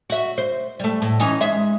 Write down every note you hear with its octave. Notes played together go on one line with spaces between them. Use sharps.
F#4 E5
C5
G3 A3
A2
E3 C#4 D#4
G#3 E5